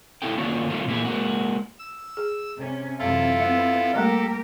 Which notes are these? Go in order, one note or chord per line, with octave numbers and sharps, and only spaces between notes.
B3 E4 G4 A4 G5
D#3 A#3 C#4 D4 F4 F#4
D#3 G3 A3 B3 F4
A#2 E3 A#3 B3 G#4
G#3 A#3 F#4
E6
G#4
C3 C#4
F#2 C3 E3 E4 F4 A4
B3 C4 E5
G3 A3 A#3 G4 A4 A#4